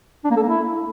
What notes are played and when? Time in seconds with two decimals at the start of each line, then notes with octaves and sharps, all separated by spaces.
0.24 D4
0.31 A#3
0.37 A4
0.43 A#3
0.49 E4